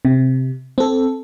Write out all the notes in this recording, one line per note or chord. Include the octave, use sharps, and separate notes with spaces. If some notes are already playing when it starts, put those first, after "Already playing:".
C3
C4 A4